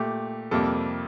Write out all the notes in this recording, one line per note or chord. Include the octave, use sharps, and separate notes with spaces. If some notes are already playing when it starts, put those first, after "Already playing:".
Already playing: A#2 A3 G4
F2 C3 G3 A#3 A4